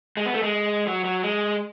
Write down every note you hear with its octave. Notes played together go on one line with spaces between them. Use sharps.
G#3
B3
A3
G#3
F#3
F#3
G#3